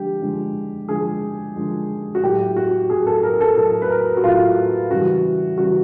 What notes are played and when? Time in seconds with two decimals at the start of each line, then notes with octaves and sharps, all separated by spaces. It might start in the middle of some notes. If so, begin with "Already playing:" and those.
Already playing: D3 F3 G#3 G4
0.22 D3 F3 G#3
0.89 D3 F3 G#3 G#4
1.56 D3 F3 G#3
2.15 F#4
2.23 A2 F#3 G4
2.56 F#4
2.90 A2 F#3 G#4
3.07 A4
3.23 A#4
3.41 A4
3.57 A2 F#3 A4
3.82 B4
3.90 A#4
4.17 F#4
4.24 A2 F#3 F4
4.91 C#3 E3 G3 F#4
5.58 C#3 E3 G3 F#4